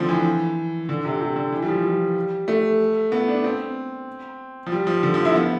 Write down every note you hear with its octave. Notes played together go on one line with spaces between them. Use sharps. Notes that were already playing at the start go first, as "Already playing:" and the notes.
Already playing: D3 F3 C4
E3
D3
C3
C3
D3
E3
G3
F3
G3
A3
B3
D4
C4
F3
G3
F3
D3
F3
E4
B3